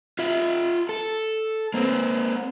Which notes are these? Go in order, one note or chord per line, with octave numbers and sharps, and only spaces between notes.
F4 E5
A4
A#3 C4